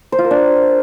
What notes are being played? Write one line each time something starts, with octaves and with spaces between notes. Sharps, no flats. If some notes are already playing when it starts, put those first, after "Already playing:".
C5
F4
A#4
D4